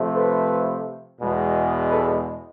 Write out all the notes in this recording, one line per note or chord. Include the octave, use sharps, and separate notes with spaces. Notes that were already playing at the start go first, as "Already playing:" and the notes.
Already playing: C3 F3 A3
A4 B4
E2 B2 G#3
A4 B4